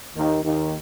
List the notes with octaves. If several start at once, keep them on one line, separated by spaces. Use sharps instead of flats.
D#2 D#3
D#2 D#3